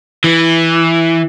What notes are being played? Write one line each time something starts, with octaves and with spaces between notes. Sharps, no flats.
E3